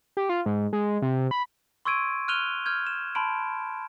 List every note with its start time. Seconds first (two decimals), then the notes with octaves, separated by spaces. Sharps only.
0.17 G4
0.29 F4
0.46 G#2
0.73 G#3
1.02 C3
1.31 B5
1.85 C6 C#6 E6 G#6 D7 D#7
2.28 F6 F#6 D#7 F7 G7
2.66 F6 G6 G#6
2.87 E7
3.15 A5 B5 C6 D7